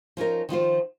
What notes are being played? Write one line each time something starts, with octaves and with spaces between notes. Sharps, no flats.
F3 C#4 D#4 A#4
D#3 F3 F4 C5